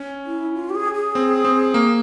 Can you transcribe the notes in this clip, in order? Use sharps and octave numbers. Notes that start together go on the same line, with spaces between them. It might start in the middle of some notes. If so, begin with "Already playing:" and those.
Already playing: C#4
E4
F4
G4
G#4
G#4
C4
C4
A#3